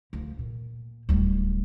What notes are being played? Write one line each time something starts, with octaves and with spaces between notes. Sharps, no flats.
D2 F3
A#2
D1 G3